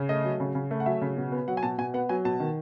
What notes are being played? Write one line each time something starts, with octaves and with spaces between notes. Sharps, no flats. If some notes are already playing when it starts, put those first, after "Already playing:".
Already playing: C#3
A3 D#5
F#3
C#3
C#3
A3
F#5
F#3 E5
C#3
B2
B3
F#3 F#5
G#5
B2 A5
B2 G#5
B3 F#5
F#3 G#5
B2 A5
D#3